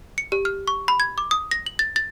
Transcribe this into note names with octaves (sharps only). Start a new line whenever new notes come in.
C#7
G4
F6
C#6
B5
G#6
D6
D#6
A#6
F#7
A6
A6